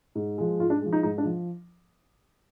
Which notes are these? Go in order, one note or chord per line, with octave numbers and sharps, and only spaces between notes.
G#2
F3 G#3
G#2 F4
D4
F3 G#3
D#4
G#2 D#4
D4
F3